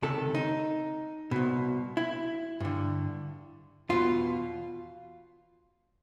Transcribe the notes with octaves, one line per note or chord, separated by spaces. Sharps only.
C#2 C3 D#3 A4
D#4
C2 B2
E4
G2 D3
E2 B2 F4